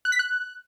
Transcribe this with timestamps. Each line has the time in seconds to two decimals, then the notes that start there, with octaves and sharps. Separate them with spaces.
0.05 F#6
0.12 B6
0.19 F#6